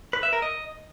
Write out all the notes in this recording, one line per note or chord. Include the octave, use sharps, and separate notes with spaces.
B4
E5
A#4
D#5